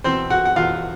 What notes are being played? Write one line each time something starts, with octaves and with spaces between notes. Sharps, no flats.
E2 B2 C4 C5
F#4 F#5
F#5
E2 B2 F4 F5